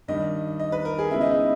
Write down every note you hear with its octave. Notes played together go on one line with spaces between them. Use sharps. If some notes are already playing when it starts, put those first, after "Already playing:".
G2 D#3 G3 D#5
D#5
B4
A#4
G#4
C#3 G#3 B3 E4
D#4
E4